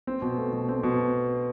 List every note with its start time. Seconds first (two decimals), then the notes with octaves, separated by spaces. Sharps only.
0.07 C4
0.22 B2
0.37 A3
0.53 B2
0.69 C4
0.83 B2